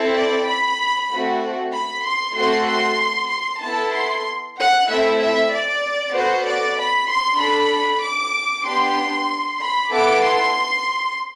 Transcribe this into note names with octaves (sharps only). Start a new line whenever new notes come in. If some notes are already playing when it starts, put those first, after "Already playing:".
Already playing: C4 E4 A4
D5
B5
A3 C4 F#4
B5
C6
A3 C4 F#4 A4 C6
C6
C6
B3 E4 A4 A5
C6
F#5
A3 C4 E4 A4 E5
E5
D5
B3 F#4 A4 C5
D5
B5
C6
D4 A4 B5
D6
B3 D4 G4 C6
B5
B3 E4 A4 D6
C6